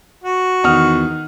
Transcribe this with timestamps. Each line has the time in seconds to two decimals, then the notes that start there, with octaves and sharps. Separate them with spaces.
0.23 F#4
0.64 E2 D#3 F#5 D#6 F6